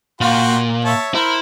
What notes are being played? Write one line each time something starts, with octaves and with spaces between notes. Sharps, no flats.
A#2 F#4 G5 C6
C#5 E5 A5
E4 A#4 C5